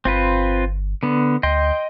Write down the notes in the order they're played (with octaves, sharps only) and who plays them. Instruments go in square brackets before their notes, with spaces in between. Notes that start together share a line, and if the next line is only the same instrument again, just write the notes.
[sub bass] G1 [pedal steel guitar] C4 F4 B4
[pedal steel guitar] D3 B3
[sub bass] D2 [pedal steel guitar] D#5 G5 C6